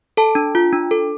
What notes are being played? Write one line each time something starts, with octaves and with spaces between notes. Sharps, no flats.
A4 A5
D4
F4
D4
A4